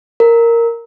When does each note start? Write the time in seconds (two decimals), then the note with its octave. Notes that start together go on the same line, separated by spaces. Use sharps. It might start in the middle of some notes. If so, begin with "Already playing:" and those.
0.20 A#4